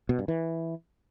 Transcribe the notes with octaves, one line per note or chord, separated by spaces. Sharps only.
B2
G2
E3